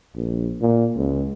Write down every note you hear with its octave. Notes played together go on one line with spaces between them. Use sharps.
A#1
A#2
C#2